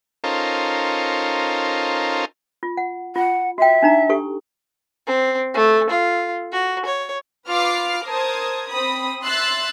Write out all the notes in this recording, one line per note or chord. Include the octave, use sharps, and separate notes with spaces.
C#4 D#4 F4 A4 A#4 C5
F4
F#5
F4 F#5
F#4 E5 G5
D4 D#4 A#5
G4 A4 C#6
C4
A3
F4
F#4
C#5
F4 B4 D6 F6 C7
A#4 C5 A5 D#6 G#6
C4 B5 D#6
E5 C6 E6 F#6 A6 C7